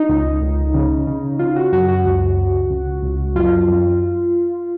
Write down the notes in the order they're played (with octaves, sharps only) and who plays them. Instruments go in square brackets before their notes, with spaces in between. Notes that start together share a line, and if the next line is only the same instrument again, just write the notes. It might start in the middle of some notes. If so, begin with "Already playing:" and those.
Already playing: [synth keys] D#4
C#2
C#2
C#3
C#3
C#3 F4
F#4
F#2 F#4
F#4
C#2
C#2
C#2
C#2
F#2 F4
F#2